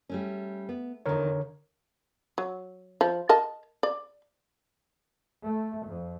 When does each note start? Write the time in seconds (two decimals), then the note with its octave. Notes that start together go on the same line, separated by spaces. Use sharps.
0.09 G3 A3 C#4
0.69 B3
1.06 E2 D3 D#3 A#4 C#5
2.38 F#3
3.01 F3
3.29 A#4 D#5 A5
3.83 D5
5.45 A3
5.85 F2